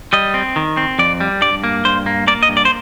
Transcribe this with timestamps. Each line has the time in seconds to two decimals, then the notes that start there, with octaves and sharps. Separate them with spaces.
0.13 G3 D#5
0.34 C4
0.56 D#3
0.77 C4
0.99 F2 D5
1.20 G3
1.42 G2 D5
1.64 A#3
1.85 G2 C5
2.06 A#3
2.27 A#3 D5
2.43 D#5
2.49 G2
2.57 D5
2.65 C5